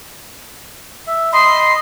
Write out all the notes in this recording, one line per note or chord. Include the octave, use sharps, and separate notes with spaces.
E5
D#5 B5 C6